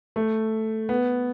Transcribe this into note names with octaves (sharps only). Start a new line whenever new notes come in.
A3
B3